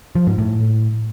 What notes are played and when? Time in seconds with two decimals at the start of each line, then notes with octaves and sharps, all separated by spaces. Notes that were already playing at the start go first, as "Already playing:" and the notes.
0.15 F3
0.27 G#2
0.38 A2